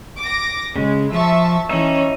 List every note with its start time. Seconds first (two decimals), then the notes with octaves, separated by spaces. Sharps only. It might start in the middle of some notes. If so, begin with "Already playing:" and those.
0.18 D6 A#6
0.76 C#3 G#3
1.12 F3 E5 A5 C#6
1.69 E3 C#4 D#4 E5